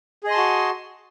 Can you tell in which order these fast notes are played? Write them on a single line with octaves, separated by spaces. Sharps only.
G#4 D#5 C6 A5 F#4